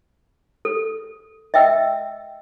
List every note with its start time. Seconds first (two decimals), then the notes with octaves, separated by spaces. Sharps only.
0.65 A4
1.54 D#5 E5 G5 E6